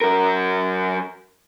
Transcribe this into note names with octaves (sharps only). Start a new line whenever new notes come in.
F#3 A#4